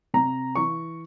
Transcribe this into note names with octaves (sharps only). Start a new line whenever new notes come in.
C3 A#5
E3 C#6